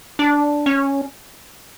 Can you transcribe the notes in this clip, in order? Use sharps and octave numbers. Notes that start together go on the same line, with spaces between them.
D4
C#4